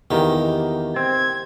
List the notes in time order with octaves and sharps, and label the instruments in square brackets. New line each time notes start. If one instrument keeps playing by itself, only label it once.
[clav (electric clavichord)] E2 D#3 [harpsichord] A#3 G4
[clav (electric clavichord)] C4 [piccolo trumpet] G#6